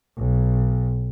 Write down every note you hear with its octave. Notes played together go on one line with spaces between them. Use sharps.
B1